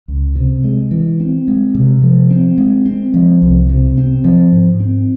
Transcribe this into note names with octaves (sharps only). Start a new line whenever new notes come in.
C#2
C3
G#3
E3
C4
G#3
C3
F3
C4
G#3
C4
F3
C2
C3
C4
F3
G#2
C4